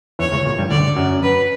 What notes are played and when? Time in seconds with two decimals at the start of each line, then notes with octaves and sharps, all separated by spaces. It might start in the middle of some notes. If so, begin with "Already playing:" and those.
0.19 E2 E3 C#5
0.32 C#2 C#3
0.46 A#2
0.58 G2 G3
0.71 D2 D3 D5
0.96 F#2 F#3
1.23 B4